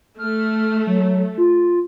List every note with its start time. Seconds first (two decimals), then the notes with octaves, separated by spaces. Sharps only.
0.18 A3 F6
0.87 F#3
1.38 F4